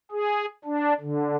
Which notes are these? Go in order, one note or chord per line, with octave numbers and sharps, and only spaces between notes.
G#4
D4
D3